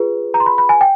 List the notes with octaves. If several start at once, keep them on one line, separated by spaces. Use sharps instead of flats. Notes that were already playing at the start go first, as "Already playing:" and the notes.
Already playing: F4 G#4 B4
A#5
C6
B5
B5
G#5
G5